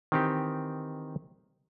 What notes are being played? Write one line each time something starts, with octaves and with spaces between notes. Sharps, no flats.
D#3 E3 C4 D#4 G4